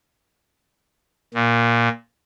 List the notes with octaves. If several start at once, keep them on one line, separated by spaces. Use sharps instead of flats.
A#2